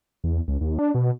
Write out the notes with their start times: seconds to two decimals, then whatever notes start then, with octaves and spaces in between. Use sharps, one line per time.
0.24 E2
0.48 C#2
0.61 D#2
0.79 D4
0.95 B2